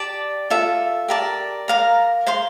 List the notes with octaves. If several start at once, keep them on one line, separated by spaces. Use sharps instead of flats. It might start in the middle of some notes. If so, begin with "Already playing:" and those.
Already playing: G4 D5 A5
F4 A4 E5
G4 A#4 D5 A5
A#4 F5 A#5
C5 F5 C6